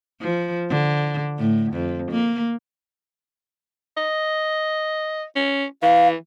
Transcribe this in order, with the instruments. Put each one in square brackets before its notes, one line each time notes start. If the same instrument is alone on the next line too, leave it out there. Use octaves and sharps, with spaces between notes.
[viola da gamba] F3
D3
A2
F2
A#3
[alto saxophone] D#5
C#4
[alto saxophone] E3 [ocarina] F5